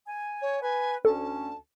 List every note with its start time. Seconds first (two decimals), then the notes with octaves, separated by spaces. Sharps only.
0.06 G#5
0.41 C#5
0.62 B4 G#5
1.05 D2 C#4 A4 A5